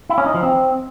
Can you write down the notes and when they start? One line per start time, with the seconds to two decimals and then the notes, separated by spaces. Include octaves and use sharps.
0.09 E4
0.18 C#4
0.26 D#4
0.34 F3
0.42 C4